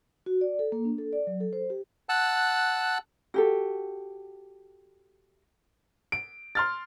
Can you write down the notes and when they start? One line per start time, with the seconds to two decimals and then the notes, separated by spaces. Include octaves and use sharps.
0.26 F#4
0.41 D5
0.59 A4
0.72 A#3
0.85 D4
0.98 A4
1.13 D5
1.27 F#3
1.40 A4
1.53 C5
1.70 G4
2.09 F#5 A5 E6 F#6
3.34 F#4 G4 A4
6.12 D7
6.55 C6 F6 A6